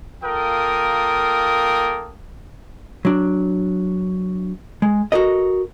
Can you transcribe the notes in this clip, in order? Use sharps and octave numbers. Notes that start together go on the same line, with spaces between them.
A#3 F4 A4 A#4 G5 D#6
F#3 D4
G#3
F#4 A4 A#4 D#5